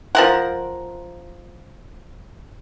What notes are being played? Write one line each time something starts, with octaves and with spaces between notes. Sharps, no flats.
F3 A#4 F#5